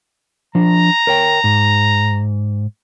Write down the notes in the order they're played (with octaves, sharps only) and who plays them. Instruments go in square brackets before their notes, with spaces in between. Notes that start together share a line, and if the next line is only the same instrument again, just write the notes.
[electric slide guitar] F3 D4 [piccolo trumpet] A#5
[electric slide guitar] A#4 C#5 G5
G#2